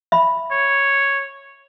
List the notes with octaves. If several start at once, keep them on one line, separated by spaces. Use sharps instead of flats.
E5 B5
C#5